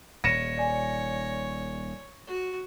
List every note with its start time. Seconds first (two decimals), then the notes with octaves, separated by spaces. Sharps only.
0.24 D#1 C#5 A#6 C#7 D#7 E7
0.58 D5 G#5
2.27 F#4